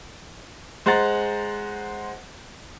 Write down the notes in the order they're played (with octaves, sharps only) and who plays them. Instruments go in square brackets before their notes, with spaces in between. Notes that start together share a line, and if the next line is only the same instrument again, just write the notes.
[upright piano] G#3 C5 F#5 A#5 A6